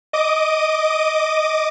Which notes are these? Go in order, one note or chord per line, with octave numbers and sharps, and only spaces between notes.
D#5 D6 D#6 D#7